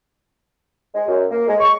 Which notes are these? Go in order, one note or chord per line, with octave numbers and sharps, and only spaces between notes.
G#3
F#2
A#3
G#3
C#6